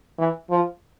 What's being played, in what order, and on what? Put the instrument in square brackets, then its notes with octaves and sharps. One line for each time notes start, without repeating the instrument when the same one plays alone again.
[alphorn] E3
F3